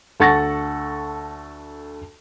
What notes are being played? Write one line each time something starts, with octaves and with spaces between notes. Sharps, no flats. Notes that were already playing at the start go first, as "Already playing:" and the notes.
D2 A4 F#5 C#6 A6 A#6